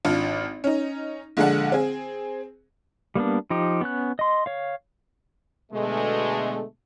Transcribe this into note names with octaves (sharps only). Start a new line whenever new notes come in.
G#1 D4 F4
C#4 D#4
A#1 D3 G#3 D4 F#5
C4 G#4
G3 A#3 B3 D4
F3 D#4 G4
B3 C#4 F#6
D#5 C6
C#5 F5
B2 D3 G#3 A3